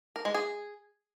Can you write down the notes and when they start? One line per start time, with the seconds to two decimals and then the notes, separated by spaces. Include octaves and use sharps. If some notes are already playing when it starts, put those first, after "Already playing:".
0.16 A#4
0.25 G#3
0.35 G#4